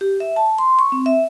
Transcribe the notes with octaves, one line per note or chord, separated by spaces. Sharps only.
G4
E5
A5
C6
C#6
C4
E5